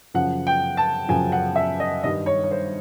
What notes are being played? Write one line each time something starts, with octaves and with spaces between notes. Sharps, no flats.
F#2 C#3 F3 F#5
G5
A5
F#2 C#3 F3 G#5
F#5
E5
D#5
G2 D#3 G3 D#5
C#5
C#5
C5